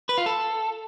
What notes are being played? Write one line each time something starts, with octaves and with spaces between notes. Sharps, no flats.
B4
F4
A4